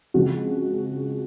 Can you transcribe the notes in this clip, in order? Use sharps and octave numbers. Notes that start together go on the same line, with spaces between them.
C#3 F3 G#3 C4 F#4